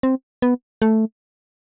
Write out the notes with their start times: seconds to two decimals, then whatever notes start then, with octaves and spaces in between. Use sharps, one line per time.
0.03 C4
0.42 B3
0.82 A3